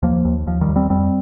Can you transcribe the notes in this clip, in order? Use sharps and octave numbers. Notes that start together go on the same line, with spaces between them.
D#2 F3 A#3
D#2
D#2 F3
D#3 G3
D#2
G3 C4
F2 G3 C4